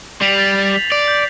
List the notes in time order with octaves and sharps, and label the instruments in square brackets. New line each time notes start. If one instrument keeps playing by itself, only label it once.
[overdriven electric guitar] G3 [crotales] C7 F7 F#7
[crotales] G6 A6
B6
[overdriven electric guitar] D5
[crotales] G6